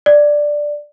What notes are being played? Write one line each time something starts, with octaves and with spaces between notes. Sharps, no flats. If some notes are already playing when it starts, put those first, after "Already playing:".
D5